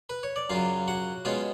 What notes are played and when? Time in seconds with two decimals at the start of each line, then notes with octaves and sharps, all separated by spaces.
0.10 B4
0.23 C#5
0.36 D5
0.50 F#2 C#3 F#3 F4 F5
0.88 F#4 F#5
1.25 B2 G#3 C#4 F4 F5